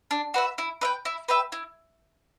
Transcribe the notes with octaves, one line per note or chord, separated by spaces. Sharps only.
D4
F#4 B4 E5
E4
B4 E5 G5
E4
B4 E5 G5
E4